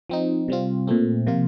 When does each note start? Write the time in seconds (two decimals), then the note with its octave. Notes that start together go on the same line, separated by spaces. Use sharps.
0.10 F3 C4 D#4
0.48 C3 G3 C4 F4
0.87 A#2 A3 C4
1.27 C3 F3 A#3 F4